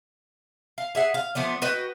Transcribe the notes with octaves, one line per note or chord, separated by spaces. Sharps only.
F5
G#4 E5 F#5
F5
F3 A3 B3 D4
F#4 B4 D#5 G5